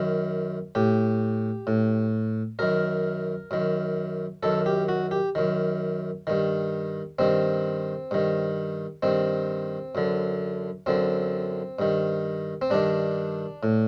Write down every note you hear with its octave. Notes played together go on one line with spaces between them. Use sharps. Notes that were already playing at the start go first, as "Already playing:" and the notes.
Already playing: F#2 D#3
A2 G4
A2
F#2 D#3 A#4
F#2 D#3
F#2 D#3 A4
G4
F#4
G4
F#2 D#3
G2 D#3
G2 D#3 C4
G2 D#3
G2 D#3 C4
F#2 D3
F#2 D3 C4
G2 D#3
C4
G2 D#3 D4
A2